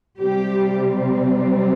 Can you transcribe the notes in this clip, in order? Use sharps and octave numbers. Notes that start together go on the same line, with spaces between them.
C3 G3 C4 G4